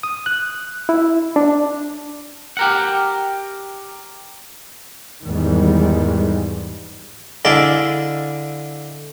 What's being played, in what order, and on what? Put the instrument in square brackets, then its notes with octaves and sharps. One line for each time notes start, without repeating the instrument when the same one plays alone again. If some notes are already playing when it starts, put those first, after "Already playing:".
[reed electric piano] D#6
F#6
E4
D4
[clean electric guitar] G4 A#4 F#5
[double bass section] E2 G#2 D#3 E3 G3 G#3
[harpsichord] D3 G#3 E4 D5 F5